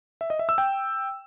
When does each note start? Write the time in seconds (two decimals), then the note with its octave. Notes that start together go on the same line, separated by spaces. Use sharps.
0.21 E5
0.30 D#5
0.39 E5
0.49 E6
0.58 G5